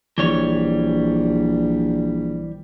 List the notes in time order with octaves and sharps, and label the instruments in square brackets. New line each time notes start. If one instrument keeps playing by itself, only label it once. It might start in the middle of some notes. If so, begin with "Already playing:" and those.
[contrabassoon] A#1 [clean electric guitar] E3 G3 C#5